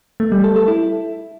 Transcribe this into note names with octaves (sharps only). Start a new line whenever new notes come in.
A3
G3
A4
A4
E4